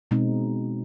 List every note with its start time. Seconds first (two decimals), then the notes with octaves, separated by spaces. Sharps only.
0.11 B2 G#3 C4 D#4